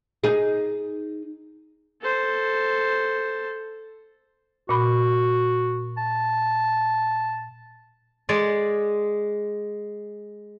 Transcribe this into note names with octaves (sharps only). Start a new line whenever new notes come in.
D#4 G#4
A4 C5
A#2 F#4 B5
A5
G#3 D5 G#5